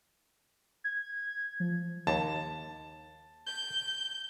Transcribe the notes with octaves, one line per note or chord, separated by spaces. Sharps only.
G#6
F3
D#2 A5
G6